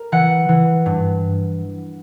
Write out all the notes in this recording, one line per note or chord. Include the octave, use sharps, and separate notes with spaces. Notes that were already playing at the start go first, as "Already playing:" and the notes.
Already playing: A#4
E3 F#5
E3
G2